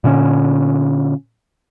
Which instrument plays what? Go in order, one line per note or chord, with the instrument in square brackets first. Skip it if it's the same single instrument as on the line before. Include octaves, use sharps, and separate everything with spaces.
[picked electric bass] A#2 D3 C#4